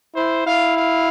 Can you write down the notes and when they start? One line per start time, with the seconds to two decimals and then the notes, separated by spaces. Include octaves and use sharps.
0.15 E4 C5
0.46 E4 F5
0.76 F5